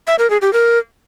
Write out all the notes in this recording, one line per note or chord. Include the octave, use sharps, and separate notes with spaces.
E5
A#4
G#4
G4
A#4